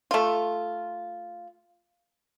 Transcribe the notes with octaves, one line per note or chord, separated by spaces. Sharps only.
A3 F4